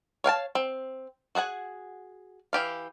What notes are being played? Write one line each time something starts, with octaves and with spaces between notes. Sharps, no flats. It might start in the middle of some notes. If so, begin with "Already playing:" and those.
C#5 F5 G5 A5
C4
F#4 G#4 F#5 G#5
E3 G4 F5